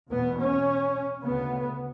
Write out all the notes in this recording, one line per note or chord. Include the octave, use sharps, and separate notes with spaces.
E2 B2 B3
C#4
D2 C#3 B3